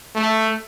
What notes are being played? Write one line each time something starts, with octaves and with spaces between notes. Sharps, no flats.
A3